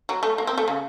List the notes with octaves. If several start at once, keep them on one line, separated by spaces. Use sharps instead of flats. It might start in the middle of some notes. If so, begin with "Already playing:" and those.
F#3
A3
A#3
C4
A3
C#3